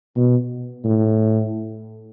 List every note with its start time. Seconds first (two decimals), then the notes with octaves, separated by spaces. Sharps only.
0.16 B2
0.85 A2